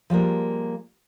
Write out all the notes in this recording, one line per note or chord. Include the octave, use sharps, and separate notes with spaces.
F3 G3 G#3 A#3